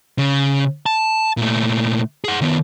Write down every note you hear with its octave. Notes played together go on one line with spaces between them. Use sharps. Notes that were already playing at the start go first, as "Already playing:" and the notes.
C#3
A5
A#2 A3
G#4 F#5
D#3 B3